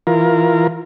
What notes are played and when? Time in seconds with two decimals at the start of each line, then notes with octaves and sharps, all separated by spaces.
0.07 E3 F4 A#4